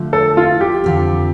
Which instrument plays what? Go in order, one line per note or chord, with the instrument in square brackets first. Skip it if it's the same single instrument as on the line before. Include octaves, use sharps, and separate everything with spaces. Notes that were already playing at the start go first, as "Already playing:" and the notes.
Already playing: [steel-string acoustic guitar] D3 F3 A3
[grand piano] A4
F4
G4
[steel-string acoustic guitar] F2 D3 F3 C4